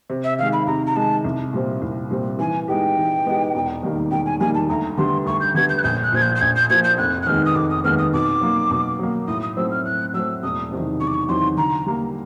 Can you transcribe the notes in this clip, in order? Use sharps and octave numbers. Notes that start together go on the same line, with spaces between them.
C3
E5
D#3 G#3 F5
B5
C3 A#5
A#5
D#3 G#3 A5
C2
A#2 G3 C4
C2
A#2 G3 C4
E3 G#5
G#3 B3 D#4 G4 G5
E3
G#3 B3 D#4 G4
E1
D#2 D#3 G3 A#3
E1 G5
G#5
D#2 D#3 G3 A#3 G#5
A5
D2 A#5
D3 G3 B3 D4 C6
D2 C#6
G6
D3 G3 B3 D4 G#6
G6
F#6
A#1 G6
F#6
A#2 F3 G#6
G6
G6
A#1 G#6
G6
A#2 F3 G#6
G6
F1 F#6
F#6
D#2 D#3 G#3 B3 F6
D#6
F1 D6
D#6
D#2 D#3 G#3 B3 F6
D#6
B2 D6
F#3 A#3
B2
F#3 A#3
A2 D#6
D#6
F#3 A3 C4 E6
F6
A2 F#6
F#3 A3 C4 E6
E1 D#6
E2 C3 D#3 F#3
E1 C#6
D6
C#6
E2 C3 D#3 F#3 C6
D3 A#5
G3 A#3